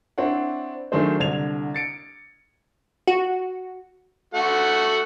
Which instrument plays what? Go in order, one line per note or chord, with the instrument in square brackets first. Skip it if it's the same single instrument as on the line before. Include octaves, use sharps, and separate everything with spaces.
[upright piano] C4 D4 E4 C#5 F#5
D#3 F#3 A3 D4 G#4 C5
C2 D3 G#6 F7
A6 C#7 D7
[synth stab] F#4
[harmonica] A3 F#4 F#5